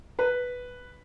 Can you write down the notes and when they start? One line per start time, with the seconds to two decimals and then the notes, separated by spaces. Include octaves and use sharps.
0.19 B4